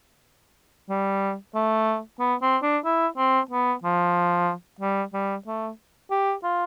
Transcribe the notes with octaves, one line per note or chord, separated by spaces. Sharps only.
G3
A3
B3
C4
D4
E4
C4
B3
F3
G3
G3
A3
G4
F4